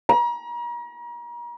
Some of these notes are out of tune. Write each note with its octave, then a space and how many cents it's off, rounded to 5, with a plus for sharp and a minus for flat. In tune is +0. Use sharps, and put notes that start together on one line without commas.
A#5 +40